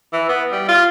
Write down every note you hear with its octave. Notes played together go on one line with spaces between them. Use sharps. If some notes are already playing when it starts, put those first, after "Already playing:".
E3
B3
G3
F4